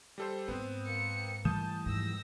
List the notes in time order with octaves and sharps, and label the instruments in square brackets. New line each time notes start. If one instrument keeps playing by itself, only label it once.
[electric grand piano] G3 A4 C5
[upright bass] G#2 [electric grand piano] B3 C4
[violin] A#3 C#7
[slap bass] E3 G3 A3 [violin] A5 [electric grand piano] D#6 G6 E7
[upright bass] F2 G#2 [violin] E6 A#6